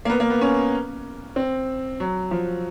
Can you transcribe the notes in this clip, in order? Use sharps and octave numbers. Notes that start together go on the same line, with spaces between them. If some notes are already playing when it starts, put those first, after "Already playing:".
A#3
B3
A#3
B3
C#4
C4
F#3
F3